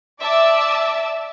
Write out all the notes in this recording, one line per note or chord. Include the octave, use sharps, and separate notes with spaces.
D5 E5 A5 D6 E6